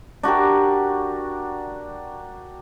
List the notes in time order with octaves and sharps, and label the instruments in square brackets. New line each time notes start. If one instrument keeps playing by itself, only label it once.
[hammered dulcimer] D4 F#4 G4 A#4